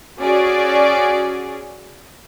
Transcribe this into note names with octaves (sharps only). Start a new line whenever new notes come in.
C#4 F#4 G#4 D5